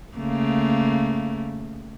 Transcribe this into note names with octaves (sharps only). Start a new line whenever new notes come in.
C#3 A3 A#3